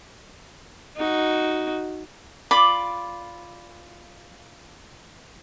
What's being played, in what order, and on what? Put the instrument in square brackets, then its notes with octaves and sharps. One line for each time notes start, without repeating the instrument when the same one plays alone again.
[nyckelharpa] D#4 F#4
[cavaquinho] F4 D5 B5 D6